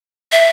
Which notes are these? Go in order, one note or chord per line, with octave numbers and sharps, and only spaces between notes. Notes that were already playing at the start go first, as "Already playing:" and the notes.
E5